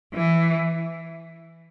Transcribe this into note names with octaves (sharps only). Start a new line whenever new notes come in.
E3